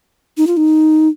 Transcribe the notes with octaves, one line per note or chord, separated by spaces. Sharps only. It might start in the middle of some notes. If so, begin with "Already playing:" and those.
D#4
F4
D#4